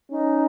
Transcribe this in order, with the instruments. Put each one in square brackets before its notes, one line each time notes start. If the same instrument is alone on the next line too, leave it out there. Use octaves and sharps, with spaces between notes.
[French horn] C#4 [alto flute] D#4